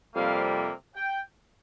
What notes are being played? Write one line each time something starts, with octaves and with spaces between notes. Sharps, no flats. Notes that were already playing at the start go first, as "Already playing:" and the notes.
F2 C3 G3 A#3 F5
G5